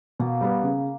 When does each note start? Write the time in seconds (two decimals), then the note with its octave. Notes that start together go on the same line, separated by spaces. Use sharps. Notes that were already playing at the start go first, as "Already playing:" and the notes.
0.20 B2 A#3
0.41 G3 B3
0.63 C#3